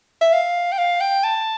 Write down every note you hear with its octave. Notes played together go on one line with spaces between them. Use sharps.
E5
F5
G5
F5
G5
A5